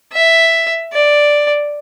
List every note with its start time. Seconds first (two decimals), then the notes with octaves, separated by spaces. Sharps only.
0.13 E5
0.93 D5